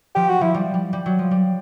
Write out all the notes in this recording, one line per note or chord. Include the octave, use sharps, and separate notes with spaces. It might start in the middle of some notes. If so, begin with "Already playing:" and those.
F3 G4
F#4
F3 E4
G3
G3
G3
F#3
F3
G3